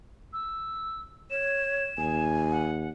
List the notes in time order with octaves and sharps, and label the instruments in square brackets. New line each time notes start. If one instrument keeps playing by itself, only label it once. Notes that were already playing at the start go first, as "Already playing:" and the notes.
[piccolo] E6
[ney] C#5 [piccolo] E7
[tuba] D#2 [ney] G#5
[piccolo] F#5